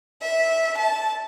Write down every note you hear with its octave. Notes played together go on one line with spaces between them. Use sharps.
E5
A5